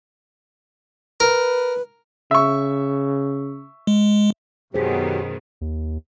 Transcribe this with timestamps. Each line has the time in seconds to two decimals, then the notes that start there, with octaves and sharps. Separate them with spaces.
1.20 A#4 B4
2.31 C#3 E5 C#6
3.87 G#3
4.74 F#2 B2 D#3 F#3 G4 G#4 C5
5.61 D#2